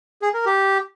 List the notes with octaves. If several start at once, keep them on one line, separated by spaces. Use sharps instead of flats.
G#4
A#4
G4